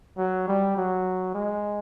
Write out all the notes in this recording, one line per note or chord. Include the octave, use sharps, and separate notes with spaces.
F#3
G3
F#3
G#3